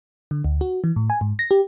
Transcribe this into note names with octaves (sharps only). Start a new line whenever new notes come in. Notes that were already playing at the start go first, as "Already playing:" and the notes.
D3
D2
F#4
E3
A2
G#5
G#2
A#6
G4